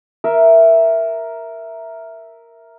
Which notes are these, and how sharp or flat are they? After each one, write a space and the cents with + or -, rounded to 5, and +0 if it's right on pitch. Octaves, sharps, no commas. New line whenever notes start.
A#4 +0 E5 +0